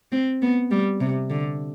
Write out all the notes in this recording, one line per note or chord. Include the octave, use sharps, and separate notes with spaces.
C4
B3
G3
C3
D3